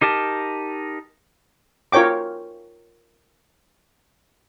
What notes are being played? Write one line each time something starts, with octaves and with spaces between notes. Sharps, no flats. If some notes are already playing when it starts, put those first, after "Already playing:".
D#4 G4 A#4 A5
F4 A#4 C#5 G5 D6